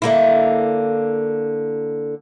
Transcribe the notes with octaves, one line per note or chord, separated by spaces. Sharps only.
D3 A#3 E4